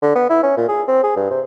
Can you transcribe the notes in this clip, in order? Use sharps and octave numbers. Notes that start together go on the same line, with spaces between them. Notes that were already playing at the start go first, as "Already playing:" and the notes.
D3
B3
E4
C#4
A#2
G#4
C4
G#4
G2
C3